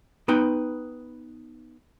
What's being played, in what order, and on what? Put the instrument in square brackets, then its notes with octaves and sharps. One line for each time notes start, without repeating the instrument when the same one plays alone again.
[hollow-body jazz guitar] B3 D#4 B4 G5